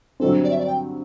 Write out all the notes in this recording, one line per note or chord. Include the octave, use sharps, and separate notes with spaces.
G2 D3 F#3 C4 A4
D5
E5
D5
G5